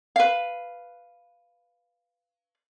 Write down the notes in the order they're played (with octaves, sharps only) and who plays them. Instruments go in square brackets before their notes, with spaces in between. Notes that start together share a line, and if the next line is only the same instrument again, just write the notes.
[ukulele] B4 F5